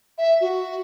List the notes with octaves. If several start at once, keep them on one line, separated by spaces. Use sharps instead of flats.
E5
F#4